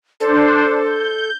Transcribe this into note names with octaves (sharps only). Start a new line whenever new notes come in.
D4 A4 C5
G6